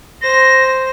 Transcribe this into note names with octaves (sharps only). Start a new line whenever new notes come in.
C5 A#6